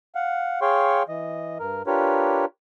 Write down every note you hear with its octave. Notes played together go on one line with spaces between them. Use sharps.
F5 F#5
G#4 C#5 F5 G5 C6 C#6
E3 D#5
G2 A#4
D4 F4 G4 A#4 B4 C#5